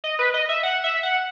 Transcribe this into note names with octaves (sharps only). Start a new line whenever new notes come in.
D#5
B4
D#5
E5
F#5
E5
F#5